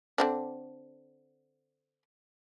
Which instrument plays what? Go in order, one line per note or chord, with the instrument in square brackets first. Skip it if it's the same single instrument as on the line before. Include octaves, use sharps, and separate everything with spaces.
[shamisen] D3 C4 D4